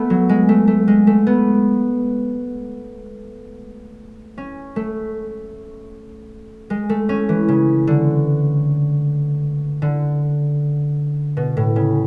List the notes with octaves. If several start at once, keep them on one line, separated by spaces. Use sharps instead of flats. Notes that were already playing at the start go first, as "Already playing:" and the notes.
Already playing: A3 B3
F#3
G#3
A3
A3
G#3
A3
B3
C#4
A3
G#3
A3
C#4
E3
C#3
D3
D3
B2
A2
C#3